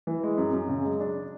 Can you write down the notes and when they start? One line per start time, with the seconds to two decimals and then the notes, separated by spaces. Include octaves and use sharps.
0.07 E3
0.23 G#3
0.38 F#2
0.53 F#2
0.69 C#3
0.85 G#3
1.00 D4